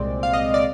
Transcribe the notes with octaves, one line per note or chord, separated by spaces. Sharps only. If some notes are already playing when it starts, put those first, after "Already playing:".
Already playing: C2 A#2 G#3 C4 D5
F5
D#5
D5